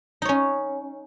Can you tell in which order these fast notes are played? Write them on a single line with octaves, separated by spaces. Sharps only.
D#4 C#5 C#4